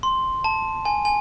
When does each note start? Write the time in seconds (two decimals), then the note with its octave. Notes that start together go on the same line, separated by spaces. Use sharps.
0.03 C6
0.44 A5
0.85 G#5
1.05 G#5